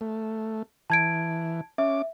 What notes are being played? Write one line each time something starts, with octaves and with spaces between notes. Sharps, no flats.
A3
E3 A5 G#6 D7
C#4 E5 D6